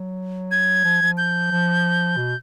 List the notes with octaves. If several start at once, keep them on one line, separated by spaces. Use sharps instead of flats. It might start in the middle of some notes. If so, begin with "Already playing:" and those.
Already playing: F#3
G#6
F3
F3
G6
F3
B2